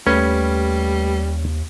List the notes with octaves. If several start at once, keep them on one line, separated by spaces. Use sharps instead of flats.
D#2 G3 A3 C#4 B4